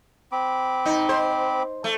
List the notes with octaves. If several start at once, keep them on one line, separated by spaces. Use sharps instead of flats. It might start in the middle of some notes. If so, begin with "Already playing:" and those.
C4 B5 D6
D#4
C5
A3